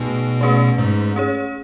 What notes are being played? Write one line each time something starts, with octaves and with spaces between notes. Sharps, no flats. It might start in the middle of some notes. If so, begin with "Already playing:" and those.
Already playing: B2 A3 D#4 G#4 B4
A3 C#4 G#4 B4
G#2
C#4 G#4 C#5